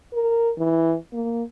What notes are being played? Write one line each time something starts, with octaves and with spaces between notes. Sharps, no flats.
A#4
E3
A#3